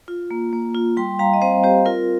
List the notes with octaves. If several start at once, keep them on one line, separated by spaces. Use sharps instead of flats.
F4
A#3
A#3
F4
G3 G5 C6
G3 F5 A#5
D#5
C4 C5 F5
C4 G4 C5
F4 A#4